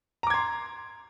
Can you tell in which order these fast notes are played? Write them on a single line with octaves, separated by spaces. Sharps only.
A#5 D6 G#6 C6